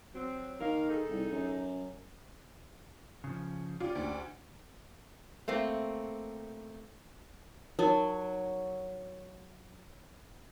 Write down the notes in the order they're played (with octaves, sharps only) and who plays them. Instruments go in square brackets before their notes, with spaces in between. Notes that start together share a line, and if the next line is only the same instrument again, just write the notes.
[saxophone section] F#3 C4
[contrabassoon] D#3 [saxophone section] A#3 A#4 F5
[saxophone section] D#4 G#4 A4
[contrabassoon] C2
F#2
[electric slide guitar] C#3 F3
[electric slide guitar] C#4 G4 D5 [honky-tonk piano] F4
[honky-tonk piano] D2
[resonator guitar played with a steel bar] A3 A#3 C4
[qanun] F#3 [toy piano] D#4 A#4